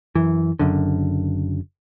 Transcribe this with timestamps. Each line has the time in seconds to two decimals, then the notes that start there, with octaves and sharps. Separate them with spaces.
0.15 F#2 E3
0.59 F#1 F#2 D3